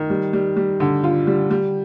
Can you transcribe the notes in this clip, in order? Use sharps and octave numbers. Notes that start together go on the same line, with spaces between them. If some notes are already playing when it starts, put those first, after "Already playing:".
Already playing: D#3
G3
G3
G3
D3
F4
G3
G3